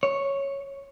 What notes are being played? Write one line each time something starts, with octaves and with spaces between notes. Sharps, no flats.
C#5